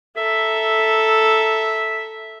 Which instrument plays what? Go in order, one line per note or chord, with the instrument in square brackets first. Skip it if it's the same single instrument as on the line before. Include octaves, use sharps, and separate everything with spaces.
[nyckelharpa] A4 A#5 [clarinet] E5